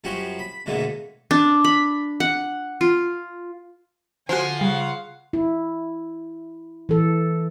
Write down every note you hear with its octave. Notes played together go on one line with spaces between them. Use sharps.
F#2 F3 G3 C#4 F#4 C6
B5
F2 G#2 B2 D3 A3 A#3
D4
B5
F#5
F4
D3 F3 F#4 C5 G#5 C7
C#3 G3 F5 F#5
E4
E3 A4